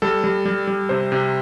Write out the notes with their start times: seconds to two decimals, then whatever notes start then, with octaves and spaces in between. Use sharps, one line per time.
0.02 G3 A4
0.24 G3
0.45 G3
0.67 G3
0.89 C3 C5
1.12 C3